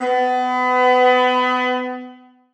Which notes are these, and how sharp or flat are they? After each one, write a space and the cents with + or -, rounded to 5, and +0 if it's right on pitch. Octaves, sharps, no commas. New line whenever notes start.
B3 +30